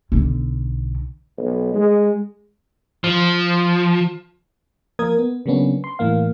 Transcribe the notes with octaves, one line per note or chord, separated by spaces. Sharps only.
B1 D3
B1
G#3
F3
F3 A#3 A#4 D#6 G#6
B3
C#3 F#3 A#3 B3 C#4 D4
C6
A2 E3 A#3 F5